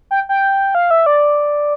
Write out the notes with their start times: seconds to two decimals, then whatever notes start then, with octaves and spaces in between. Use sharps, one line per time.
0.11 G5
0.29 G5
0.75 F5
0.91 E5
1.06 D5